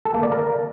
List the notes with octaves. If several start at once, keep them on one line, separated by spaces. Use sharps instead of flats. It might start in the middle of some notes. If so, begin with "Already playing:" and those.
A4
A#3
D5
A#4